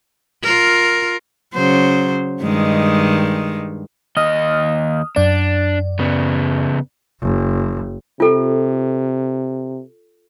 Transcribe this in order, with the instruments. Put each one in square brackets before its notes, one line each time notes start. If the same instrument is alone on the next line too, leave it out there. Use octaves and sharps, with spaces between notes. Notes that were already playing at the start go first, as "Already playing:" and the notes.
[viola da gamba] F4 A#4
C#3 F#3 C5
G2 D#3 G#3
[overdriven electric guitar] D#2 D#5 [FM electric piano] D#6 F6
[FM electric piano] F#2 D5 [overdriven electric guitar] D4
[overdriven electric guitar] C#3 B3
[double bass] F#1
[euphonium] C3 [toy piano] F4 A4